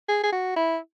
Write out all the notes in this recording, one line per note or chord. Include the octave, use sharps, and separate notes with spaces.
G#4
G#4
F#4
E4